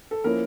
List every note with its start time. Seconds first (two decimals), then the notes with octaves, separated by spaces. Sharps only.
0.11 A4
0.24 F3 A#3 C#4 E4 A#4